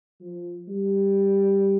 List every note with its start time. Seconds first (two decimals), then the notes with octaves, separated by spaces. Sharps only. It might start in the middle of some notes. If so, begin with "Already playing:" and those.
0.21 F3
0.68 G3